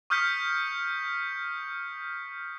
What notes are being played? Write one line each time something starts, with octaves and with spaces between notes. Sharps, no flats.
C#6 D#6 F6 G6 B6 C#7